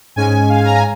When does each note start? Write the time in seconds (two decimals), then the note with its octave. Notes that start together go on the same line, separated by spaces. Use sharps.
0.16 G#2 G#3 C#4 G#5
0.49 F5
0.57 G#5
0.65 A#5
0.75 G#5